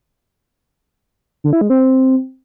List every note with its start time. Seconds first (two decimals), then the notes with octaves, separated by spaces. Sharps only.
1.44 D3
1.53 E4
1.61 G#3
1.70 C4